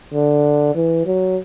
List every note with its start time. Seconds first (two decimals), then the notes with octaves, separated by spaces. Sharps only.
0.14 D3
0.75 E3
1.06 F#3